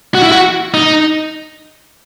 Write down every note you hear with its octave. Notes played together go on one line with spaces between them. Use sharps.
F#4
E4
F#4
D#4